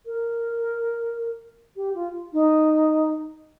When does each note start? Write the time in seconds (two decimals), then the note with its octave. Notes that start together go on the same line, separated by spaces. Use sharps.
0.06 A#4
1.77 G4
1.95 F4
2.33 D#4